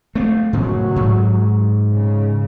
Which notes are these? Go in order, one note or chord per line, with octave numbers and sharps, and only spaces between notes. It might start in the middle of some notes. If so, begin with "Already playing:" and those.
A3 C4
F#2 A2 C#3 F#3
G#2
C#3